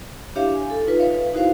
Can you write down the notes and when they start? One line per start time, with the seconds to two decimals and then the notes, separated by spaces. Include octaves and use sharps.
0.35 D4 E4 G4 C#5 E5 F5
0.54 G#5
0.70 A4
0.87 D#4 F4 B4
0.99 B4 C#5 E5 F5
1.33 D#4 E4 F#4 A#4 C5 F5